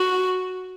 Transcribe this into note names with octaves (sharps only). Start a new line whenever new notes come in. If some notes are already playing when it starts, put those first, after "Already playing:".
Already playing: F#4